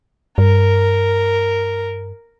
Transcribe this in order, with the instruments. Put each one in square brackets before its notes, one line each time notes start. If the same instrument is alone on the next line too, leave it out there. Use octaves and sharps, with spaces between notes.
[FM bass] G2 [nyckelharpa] A#4